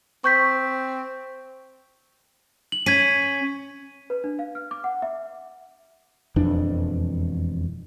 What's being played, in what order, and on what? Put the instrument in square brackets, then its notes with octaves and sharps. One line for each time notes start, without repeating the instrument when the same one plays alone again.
[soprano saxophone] C4 [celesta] C#6 G6 B6
[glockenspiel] F#7
[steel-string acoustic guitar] C#4 [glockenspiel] G#6 B6 D#7
[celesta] B4
D4
F5
F6
D6
F#5
E5
[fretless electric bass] E1 F2 E3 D4